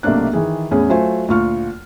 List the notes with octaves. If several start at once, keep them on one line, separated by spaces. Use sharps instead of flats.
B1 C3 A3 A#3 D4 F#6
D#3 E3 G#4
E2 A2 C#4 G#4
F#3 A3 F4 C5 G#5
D2 A#2 F4 C#6 F6